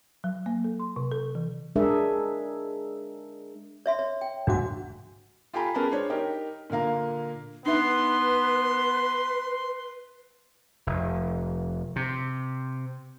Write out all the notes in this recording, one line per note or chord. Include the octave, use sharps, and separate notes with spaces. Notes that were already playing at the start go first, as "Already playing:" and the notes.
F#3
A#3
A4
C6
C3
A4
E3
G#3 D4 G#4 A#4 E5
C#5 E5 C6
C#5
G5
G2 A3 D4 F#4 F#5
F4 G4 A4 G#5 A#5 B5
C#4 G#4 A#4 B4 A5 B5
G#3 D4 C5 C#5
D#4 G4 A#4 D#5
A#2 D3 A#4 F5 A#5
B3 D4 D#4 B4 E5 C6
F1
C3